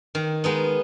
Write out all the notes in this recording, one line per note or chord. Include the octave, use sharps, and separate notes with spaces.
D#3
G#3 B3 D#4